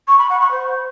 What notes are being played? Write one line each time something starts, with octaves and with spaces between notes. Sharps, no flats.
C#6
B5
F#5
C#6
C5